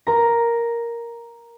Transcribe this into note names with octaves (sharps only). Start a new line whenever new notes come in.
A#4 A#5